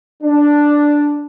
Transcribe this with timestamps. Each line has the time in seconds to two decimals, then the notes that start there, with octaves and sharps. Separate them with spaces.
0.22 D4